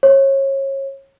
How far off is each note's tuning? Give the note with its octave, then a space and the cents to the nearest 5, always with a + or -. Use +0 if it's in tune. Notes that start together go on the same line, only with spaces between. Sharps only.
C#5 -30